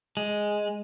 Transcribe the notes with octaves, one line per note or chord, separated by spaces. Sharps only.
G#3